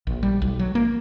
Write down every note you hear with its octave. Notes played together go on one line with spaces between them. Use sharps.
A#1
G3
B1
F#3
A#3